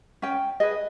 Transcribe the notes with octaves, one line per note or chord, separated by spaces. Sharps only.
C#4 G5
G#4 B4 D#5